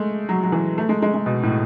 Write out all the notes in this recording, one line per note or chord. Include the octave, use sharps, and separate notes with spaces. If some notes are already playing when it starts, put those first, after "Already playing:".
Already playing: G#3 A3
F#3
F#3
E3
A3
G#3
G#3
G#3
B2
A2